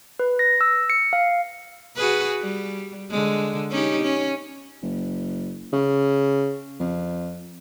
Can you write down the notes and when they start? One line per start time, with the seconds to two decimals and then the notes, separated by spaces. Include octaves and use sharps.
0.20 B4
0.39 A#6
0.61 E6
0.90 C#7
1.13 F5
1.96 F#4 G#4 B4
2.41 G3
3.11 D3 G#3
3.71 C#4 D#4 G4
4.02 C#4
4.82 F#1
5.73 C#3
6.80 F2